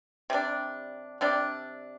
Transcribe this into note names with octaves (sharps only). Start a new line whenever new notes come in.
C3 G3 D4
C3 G3 D4